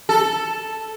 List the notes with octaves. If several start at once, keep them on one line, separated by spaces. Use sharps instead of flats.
A4